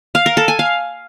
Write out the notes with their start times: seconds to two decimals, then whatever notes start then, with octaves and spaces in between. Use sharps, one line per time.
0.15 F5
0.26 A#4
0.37 A4
0.48 G#5
0.59 F5